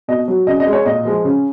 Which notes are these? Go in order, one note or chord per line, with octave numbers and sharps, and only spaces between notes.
B2 D#5
F#3
C#3 D#5
D#5
G#3
C#5
A#2 D#5
F3 G#3
C#3